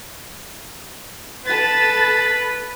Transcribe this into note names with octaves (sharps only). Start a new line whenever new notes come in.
A4 B4 A6